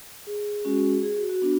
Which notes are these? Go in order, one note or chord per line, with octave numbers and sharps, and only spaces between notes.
G#4
G#3 C#4 F#4
G#4
F#4
F#4
B3 D4 F#4